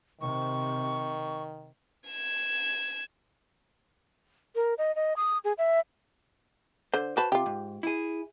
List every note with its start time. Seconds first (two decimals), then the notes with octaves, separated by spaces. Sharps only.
0.21 C3 D#3 C#6
2.10 G#6 E7
4.55 A#4
4.78 D#5
4.96 D#5
5.16 D#6
5.44 G#4
5.58 E5
6.94 D3 C5
7.17 F#4 B4 C5 A5
7.32 C3 F4 G4
7.46 G#2
7.83 E4 G#4